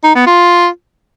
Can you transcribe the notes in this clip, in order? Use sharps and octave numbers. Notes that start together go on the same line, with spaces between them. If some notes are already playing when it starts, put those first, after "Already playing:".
D#4
B3
F4